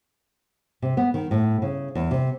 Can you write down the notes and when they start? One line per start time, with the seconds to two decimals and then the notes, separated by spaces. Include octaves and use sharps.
0.82 C3
0.97 B3
1.14 D#3
1.31 A2
1.62 C#3
1.95 E2
2.11 C3